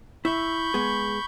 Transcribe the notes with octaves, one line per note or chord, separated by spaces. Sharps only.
E4 E5 B5 C#6 G6
G#3 B3 G#4